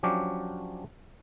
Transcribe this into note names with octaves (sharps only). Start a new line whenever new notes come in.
F3 F#3 C#4 D4 G4